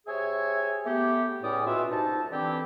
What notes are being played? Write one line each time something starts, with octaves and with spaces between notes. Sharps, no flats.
C3 G#4 C#5 E5 G#5
A3 B3 G4
C#2 A2 C#4 D5 D#6
B2 F4 F#4 E5
C2 D#4 A5
D3 E3 C4 E4 G4